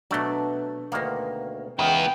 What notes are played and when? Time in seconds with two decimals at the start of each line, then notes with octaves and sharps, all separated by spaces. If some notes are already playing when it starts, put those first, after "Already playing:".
0.11 B2 F#3 A3 D4
0.92 D2 D#3 A#3 B3 F#4
1.79 C#2 D#3 B3 E4 G5